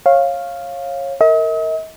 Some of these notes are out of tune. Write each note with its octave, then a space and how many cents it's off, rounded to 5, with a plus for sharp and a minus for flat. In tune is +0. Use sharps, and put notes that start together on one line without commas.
C#5 -20 F5 +0
A#4 -20 D#5 +45